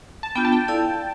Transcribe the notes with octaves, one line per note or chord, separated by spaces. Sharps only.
A5
B3 D4 F4 G5
A5
G5
E4 A4 D5 F5